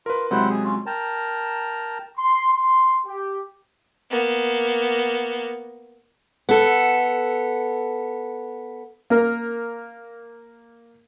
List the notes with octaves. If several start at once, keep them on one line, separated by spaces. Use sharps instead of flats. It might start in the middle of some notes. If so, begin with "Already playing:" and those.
F4 A#4 B4
C3 F#3 G#3 E4 C5 F#5
G#4
C#4 F4
A#4 G5 A5 A#5
C6
C6
G4
A#3 B3
B3 A4
A#3 A#4